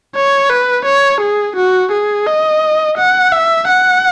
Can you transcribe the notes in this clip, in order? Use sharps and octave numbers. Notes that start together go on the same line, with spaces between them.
C#5
B4
C#5
G#4
F#4
G#4
D#5
F#5
E5
F#5